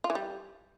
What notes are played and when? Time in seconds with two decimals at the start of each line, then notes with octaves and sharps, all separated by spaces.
0.04 F4
0.10 E3
0.15 G3